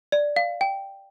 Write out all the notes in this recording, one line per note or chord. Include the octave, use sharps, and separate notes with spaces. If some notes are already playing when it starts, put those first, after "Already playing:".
D5
F5
G5